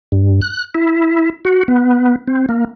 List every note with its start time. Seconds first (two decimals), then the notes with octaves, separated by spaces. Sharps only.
0.12 G2
0.42 F#6
0.75 E4
1.45 F#4
1.68 B3
2.28 C4
2.49 A#3